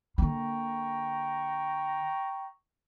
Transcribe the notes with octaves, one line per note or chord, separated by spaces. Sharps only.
D3 A#3 G5 A#5 C#6